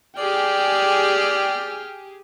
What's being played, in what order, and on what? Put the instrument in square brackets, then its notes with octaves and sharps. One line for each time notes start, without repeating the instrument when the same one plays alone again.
[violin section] G4 G#4 [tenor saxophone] D5 [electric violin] G5 F6